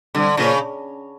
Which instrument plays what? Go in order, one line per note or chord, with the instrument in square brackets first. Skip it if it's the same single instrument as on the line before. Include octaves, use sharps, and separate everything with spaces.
[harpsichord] C2 [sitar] D3
[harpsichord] A#2 F3 A#3 C#4 [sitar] C#3